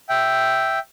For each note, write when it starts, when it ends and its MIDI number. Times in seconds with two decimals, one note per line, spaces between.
0.09 0.79 76
0.09 0.79 79